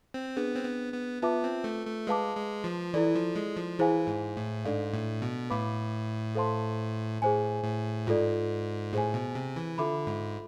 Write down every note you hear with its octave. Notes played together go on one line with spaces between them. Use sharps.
C4
B3 D4 G#4 B4
C4
B3
B3
B3 F4 B4 E5 A5 D6
C4
A3
A3
G#3 B4 F5 A5 D6
G#3
F3
E3 E4 A4 D5
F3
G#3
F3
E3 E4 G#4 C5 F5 G#5
G#2
A2
G#2 D4 A4 D5 F5
A2
B2
A2 B4 F5 B5 D6
A4 C5 F5 A5 C6
A2 G#4 C5 G#5
A2
G#2 F4 A4 D5
A2 G#4 C5 G#5
B2
C3
E3
D3 F4 A4 E5 B5 D6
G#2